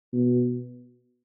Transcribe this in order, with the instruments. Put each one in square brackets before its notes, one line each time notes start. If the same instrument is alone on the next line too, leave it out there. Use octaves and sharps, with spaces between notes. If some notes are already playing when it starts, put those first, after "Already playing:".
[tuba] B2